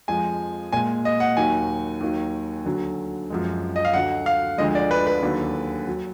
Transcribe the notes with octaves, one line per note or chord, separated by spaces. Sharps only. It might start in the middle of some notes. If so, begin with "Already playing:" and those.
F2 F3 G#3 G#5
A#2 G#3 G#5
D#5
F#5
D#2 D#3 F#3 G#5
D#2 D#3 F#3
D2 D3 F#3
F#2 F3 G#3
D#5
F5
D2 D3 F#3 F#5
F5
D2 D3 F3 G#3 D#5
D5
B4
B4
D#2 D3 F#3
F#3